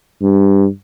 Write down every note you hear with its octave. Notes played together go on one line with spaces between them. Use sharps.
G2